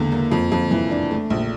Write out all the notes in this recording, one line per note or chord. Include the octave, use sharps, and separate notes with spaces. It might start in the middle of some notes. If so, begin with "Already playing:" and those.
Already playing: E2 D3 A#3
A#3
F2
F2
E3
D4
A3
A#1